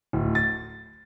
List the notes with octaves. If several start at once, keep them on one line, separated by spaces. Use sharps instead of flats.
D1
A6